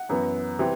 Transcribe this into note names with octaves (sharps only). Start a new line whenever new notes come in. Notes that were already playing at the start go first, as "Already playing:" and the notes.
Already playing: F#5
F#2 E3 B3
C3 E3 G3 C4